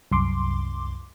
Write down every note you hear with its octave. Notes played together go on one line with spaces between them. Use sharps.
C2 F#2 C6 D6